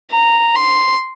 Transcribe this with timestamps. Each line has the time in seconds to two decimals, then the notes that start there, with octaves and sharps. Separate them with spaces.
0.11 A#5
0.55 C6